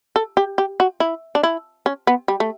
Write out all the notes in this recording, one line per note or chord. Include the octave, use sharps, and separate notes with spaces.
A4
G4
G4
F#4
E4
D4
E4
C#4
B3
G3
A3